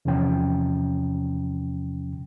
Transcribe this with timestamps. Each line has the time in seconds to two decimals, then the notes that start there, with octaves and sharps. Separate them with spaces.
0.05 E2 C3 F3 C#4 G5